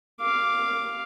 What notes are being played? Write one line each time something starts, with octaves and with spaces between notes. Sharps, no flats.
F5 D6